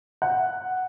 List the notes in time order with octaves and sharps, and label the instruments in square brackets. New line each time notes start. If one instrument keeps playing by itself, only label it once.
[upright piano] F#5